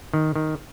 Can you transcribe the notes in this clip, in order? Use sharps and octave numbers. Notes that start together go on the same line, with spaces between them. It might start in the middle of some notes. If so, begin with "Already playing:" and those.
D#3
D#3